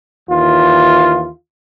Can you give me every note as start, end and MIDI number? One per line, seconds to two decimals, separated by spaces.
0.30 1.30 39
0.30 1.30 52
0.30 1.30 65